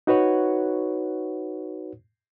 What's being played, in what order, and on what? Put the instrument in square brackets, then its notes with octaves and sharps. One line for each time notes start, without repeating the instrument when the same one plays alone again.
[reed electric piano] D#4 F#4 B4 C#5 F#5